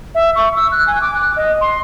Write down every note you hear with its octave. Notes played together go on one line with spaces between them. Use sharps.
E5
C#6
E6
F#6
G#5
D6
F#6
D#5
C6